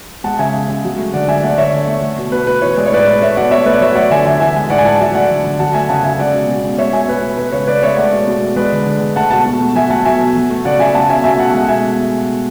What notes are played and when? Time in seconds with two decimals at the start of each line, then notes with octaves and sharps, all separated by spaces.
0.24 G#3 F#5 A5
0.39 C#3 E5 G#5
0.54 C#3
0.69 G#3
0.84 F#3
0.98 A3
1.13 D3 D5 F#5
1.28 D3 E5 G#5
1.43 A3 D5 F#5
1.58 D3 C#5 E5
1.73 D3
1.87 A3
2.02 A3
2.18 B2
2.32 B2 B4
2.47 A3 B4
2.62 E3 C#5
2.77 G#3 D5
2.86 C#5
2.92 A2 B4 D5
3.07 A2
3.22 A3 C#5 E5
3.36 B2 D5 F#5
3.51 B2 C#5 E5
3.66 A3 B4 D5
3.81 F#3 C#5 E5
3.95 A3 D5 F#5
4.11 D3 E5 G#5
4.25 D3 E5 G#5
4.40 E3 E5 G#5
4.56 G#3
4.70 A2 D5 F#5
4.78 G#5
4.85 A2 F#5 A5
5.00 F#3 E5 G#5
5.14 A3 D5 F#5
5.30 D3
5.44 D3
5.59 F#3 F#5 A5
5.74 A3 E5 G#5
5.89 C#3 F#5 A5
6.04 C#3 E5 G#5
6.18 G#3 D5 F#5
6.34 B2
6.49 B2
6.64 G#3
6.78 A3 C#5 E5
6.93 B2 E5 G#5
7.08 B2 B4
7.22 A3
7.38 G#3 B4
7.52 C#3 C#5
7.67 C#3 B4 D5
7.82 G#3 C#5 E5
7.97 A3 D5 F#5
8.13 B2
8.28 B2
8.42 A3
8.56 G#3 B4 D5
8.72 D3
8.86 D3
9.01 G#3
9.16 A3 F#5 A5
9.31 B2 F#5 A5
9.46 B2
9.61 A3
9.75 F#3 E5 G#5
9.90 A3 F#5 A5
10.05 B2 E5 G#5
10.20 B2
10.36 F#3
10.50 A3
10.65 C#3 D5 F#5
10.79 C#3 E5 G#5
10.94 A3 F#5 A5
11.09 B2 E5 G#5
11.24 B2 E5 G#5
11.39 A3 F#5 A5
11.54 G#3 F#5 A5
11.68 B2 E5 G#5